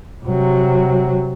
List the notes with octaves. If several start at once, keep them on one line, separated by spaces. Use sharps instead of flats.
C3 F#3